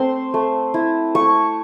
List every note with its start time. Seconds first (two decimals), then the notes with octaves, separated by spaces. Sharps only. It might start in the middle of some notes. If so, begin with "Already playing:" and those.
Already playing: A3 C4 C6
0.34 A3
0.74 E4
1.15 A3 C#6